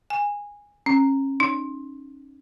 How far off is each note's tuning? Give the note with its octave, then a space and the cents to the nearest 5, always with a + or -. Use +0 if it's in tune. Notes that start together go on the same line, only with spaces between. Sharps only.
G#5 -15
C#4 -30
D#4 -35